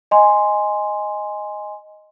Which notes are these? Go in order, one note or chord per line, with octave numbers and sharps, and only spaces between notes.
D#5 G#5 C6